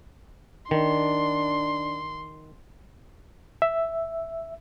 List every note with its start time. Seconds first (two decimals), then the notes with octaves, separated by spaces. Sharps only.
0.71 D#3 D4 C6
3.62 E5